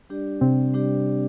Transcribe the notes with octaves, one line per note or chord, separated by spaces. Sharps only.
G3 D4 G4 D5
C3 C4
G3 D4 G4 D5